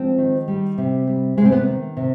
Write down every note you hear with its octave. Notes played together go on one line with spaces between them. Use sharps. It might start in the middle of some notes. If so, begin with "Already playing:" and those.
Already playing: F3 G#3 C4
D#3
G3
C3
G3
C3 G#3
C4
B3
D#3
C3